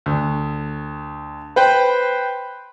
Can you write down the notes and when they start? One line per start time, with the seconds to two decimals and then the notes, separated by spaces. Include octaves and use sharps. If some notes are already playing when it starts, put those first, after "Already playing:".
0.06 D2
1.56 B4 C5 G5